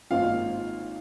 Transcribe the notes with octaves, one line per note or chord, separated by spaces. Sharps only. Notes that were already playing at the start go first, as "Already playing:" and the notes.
G#1 G#2 F3 A#3 F4 F5